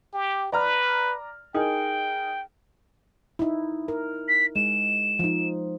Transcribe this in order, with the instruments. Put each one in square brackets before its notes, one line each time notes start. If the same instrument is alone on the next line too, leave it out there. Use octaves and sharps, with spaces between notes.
[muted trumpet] G4
[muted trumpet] B4 [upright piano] D5 A#5 F6
[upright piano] D#4 G#4 A#4 [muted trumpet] G5
[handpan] D#4 E4
A#4
[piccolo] B6
[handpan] G#3 [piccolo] E7
[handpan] F3 D#4